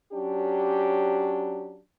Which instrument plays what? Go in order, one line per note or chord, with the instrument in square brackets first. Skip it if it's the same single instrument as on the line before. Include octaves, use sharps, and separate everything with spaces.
[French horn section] F#3 C#4 D4 G4